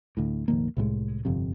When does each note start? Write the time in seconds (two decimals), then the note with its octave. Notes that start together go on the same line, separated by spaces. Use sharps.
0.17 D2 A2
0.48 F1 A#1 D#3 A#3
0.77 C2 A2 G3 G#3
1.25 G1 F2 C3